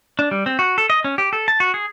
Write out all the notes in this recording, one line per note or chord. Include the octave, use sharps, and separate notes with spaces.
D4
G3
C4
F#4
A4
D#5
C#4
G4
A4
A5
F#4
G#4